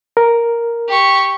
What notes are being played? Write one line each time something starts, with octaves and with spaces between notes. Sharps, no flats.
A#4
G4 C#6